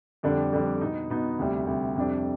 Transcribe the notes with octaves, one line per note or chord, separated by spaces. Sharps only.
F2 D3 G3 D4
F2 D3 G3 D4
B2 B3 D#4
B2 B3 D#4
D2 C3 G3
D2 C3 G3
F2 C3 G3 D4